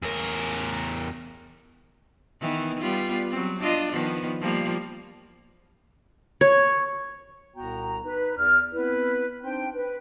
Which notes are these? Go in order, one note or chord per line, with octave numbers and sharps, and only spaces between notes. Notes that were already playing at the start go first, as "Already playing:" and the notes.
E2 A#4
D#3 E3 B3
G3 B3 F4
F#3 C4
D4 F4 D#5
D#3 F3 B3
F3 G3 A#3
C#5
C2 A#2 B3 F#4 G5 A#5
D#4 B4
E2 D5 F6
B3 C4 E4 B4
C4 D4 D#4 C5 G5
B4